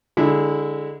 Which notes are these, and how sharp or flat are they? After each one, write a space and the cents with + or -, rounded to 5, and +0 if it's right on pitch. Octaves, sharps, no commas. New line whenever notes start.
D3 +0 G#3 -20 E4 -15